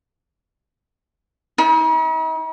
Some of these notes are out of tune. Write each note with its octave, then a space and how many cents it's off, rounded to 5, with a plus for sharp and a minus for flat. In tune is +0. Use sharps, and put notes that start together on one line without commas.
D#4 +45